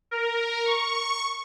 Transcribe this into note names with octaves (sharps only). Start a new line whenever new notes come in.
A#4
C#6